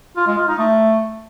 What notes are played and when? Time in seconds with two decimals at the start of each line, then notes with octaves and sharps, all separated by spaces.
0.16 F4
0.27 G#3
0.37 F4
0.48 D#4
0.58 A3